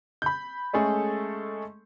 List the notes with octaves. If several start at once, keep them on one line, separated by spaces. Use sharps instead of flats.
B5 G6
G#3 A3 C#4 G#4 A4